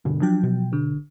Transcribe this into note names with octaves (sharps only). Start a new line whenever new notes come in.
B1 G2 B2 D3
F3 F#3 D4 G5
B2
G#1 D3